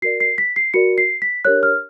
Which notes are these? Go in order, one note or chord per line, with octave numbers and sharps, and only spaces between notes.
F#4 A#4 D5 C7
C7
B6
C7
F#4 A#4 D5 C#7
C7
B6
D4 G4 A#4 C#5 F#6
F6